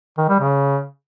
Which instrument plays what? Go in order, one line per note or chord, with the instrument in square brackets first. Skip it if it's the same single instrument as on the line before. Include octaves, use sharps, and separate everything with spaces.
[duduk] D#3
G3
C#3